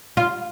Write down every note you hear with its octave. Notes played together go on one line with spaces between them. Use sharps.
F4